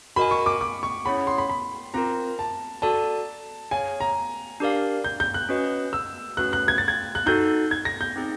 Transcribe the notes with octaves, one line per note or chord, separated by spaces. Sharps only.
F#4 A#4 D#5 G#5 B5
C#6
D6
D6
C#6
C#4 E4 G#4 C#5 F#5 B5
C6
B5
B5
C4 F4 A#4 A#5
A5
F#4 A4 D5 A5
G#4 C#5 F5 G#5
A#5
D4 G4 A#4 D5 F5
G6
G6
F#6
C#4 F#4 B4 D#5
E6
A3 C#4 F#4 B4 F#6
F#6
G#6
A6
G#6
F#6
D#4 F#4 A4 G6
G#6
A#6
G6
C4 D#4 G#4